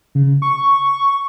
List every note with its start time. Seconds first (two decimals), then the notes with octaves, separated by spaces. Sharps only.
0.15 C#3
0.42 C#6